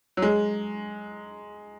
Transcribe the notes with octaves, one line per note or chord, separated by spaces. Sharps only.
F#3
G#3